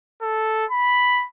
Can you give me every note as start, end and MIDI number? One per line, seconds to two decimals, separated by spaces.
0.22 0.65 69
0.71 1.26 83